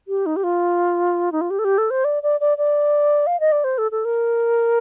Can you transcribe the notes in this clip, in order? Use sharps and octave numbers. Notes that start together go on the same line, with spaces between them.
G4
D#4
G4
F4
D#4
F4
G4
A4
G4
A4
C5
D5
D5
D5
D5
F5
D#5
D5
C5
A4
A4
A#4